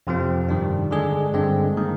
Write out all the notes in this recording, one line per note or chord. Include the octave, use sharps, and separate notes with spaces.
F2 C3 F3 C4
G2 D#3 G3 D4
D3 G#3 D4 G#4
G2 D3 G#3 C4
D#3 A#3